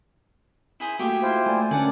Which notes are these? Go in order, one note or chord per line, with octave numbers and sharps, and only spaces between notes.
E4 G#4 C5
A3 A#3 F#4 G4 E5 G5
E4 F4 C5
A3 D5 G#5
D3 C#4 A#4 D5 F#5 G#5 A5